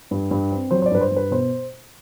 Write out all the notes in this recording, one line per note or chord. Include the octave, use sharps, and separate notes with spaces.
G2
G2
C4
F#3 C5
C5
D5
G2 B4
C5
G2 B4
B2 C5